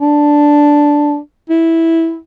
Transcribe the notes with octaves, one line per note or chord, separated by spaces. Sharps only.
D4
E4